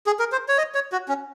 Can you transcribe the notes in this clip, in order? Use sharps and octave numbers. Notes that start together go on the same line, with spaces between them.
G#4
A#4
C5
C#5
D#5
C#5
F#4
C#4